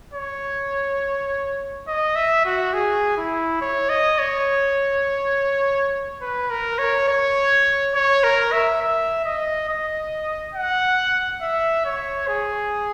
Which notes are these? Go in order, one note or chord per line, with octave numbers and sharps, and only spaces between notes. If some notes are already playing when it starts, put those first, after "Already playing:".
C#5
D#5
E5
F#4
G#4
E4
C#5
D#5
C#5
B4
A#4
C#5
C#5
C#5
A#4
E5
E5
D#5
D#5
F#5
E5
C#5
G#4